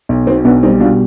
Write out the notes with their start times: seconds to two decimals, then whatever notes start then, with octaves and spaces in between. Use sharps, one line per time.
0.09 B1
0.26 B2 C4 D#4
0.45 B1 B3 D4
0.63 G3 C4 D#4
0.80 B2 D4 F4